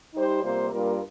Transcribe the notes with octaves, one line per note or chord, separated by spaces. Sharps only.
G3 D#4 G4 C5
C3 G3 A#3 F4 C5
G2 G3 A#3 F4 A#4